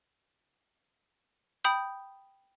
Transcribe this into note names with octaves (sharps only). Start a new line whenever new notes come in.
G5 B5 D#6 G6